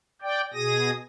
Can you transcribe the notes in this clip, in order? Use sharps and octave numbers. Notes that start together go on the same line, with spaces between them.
D5 G5
B2 G#4 D#6 A#6